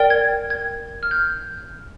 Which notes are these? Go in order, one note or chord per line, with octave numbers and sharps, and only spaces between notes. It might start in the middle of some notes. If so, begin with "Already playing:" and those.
Already playing: A#4 D5 G5
G#6
G#6
F6
G6